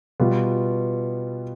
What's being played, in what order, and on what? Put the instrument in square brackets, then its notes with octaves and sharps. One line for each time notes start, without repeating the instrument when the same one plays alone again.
[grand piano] B2 G3 B3 F4